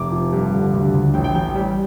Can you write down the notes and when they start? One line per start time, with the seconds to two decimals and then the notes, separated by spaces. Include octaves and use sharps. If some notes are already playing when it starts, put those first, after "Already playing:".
Already playing: F1 D6
0.12 F3
0.33 G2
0.53 D3
0.73 D2
0.94 D2
1.14 A1 G5
1.24 G5
1.35 A1 G5
1.55 G3